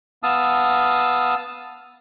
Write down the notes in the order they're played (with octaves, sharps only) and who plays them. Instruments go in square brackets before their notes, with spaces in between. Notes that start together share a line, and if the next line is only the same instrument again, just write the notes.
[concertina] B3 F5 A5 D#6 E6